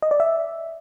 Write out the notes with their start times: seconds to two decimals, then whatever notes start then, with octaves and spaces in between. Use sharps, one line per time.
0.02 D#5
0.11 D5
0.20 E5